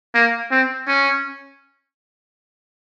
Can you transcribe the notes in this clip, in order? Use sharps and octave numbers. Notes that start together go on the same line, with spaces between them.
A#3
C4
C#4